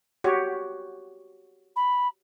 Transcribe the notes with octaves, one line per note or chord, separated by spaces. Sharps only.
F#4 G4 C#5
B5